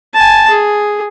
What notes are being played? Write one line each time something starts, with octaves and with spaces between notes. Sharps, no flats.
G#5 A5
G#4